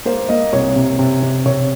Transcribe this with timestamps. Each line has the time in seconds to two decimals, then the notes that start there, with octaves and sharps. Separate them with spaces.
0.05 A#3 C5
0.29 A#3 D#5
0.53 C2 C#5
0.76 C3
0.99 C3
1.23 C3
1.46 C3 C#5